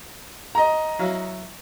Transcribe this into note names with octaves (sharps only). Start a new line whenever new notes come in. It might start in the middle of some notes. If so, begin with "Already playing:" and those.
D#5 A#5
F#3 E4 F5